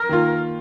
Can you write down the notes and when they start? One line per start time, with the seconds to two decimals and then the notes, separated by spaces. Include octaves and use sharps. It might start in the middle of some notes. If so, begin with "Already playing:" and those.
Already playing: A#4
0.09 D#3 A#3 F4